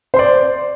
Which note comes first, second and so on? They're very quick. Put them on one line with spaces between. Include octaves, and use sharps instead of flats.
C5 C6 D5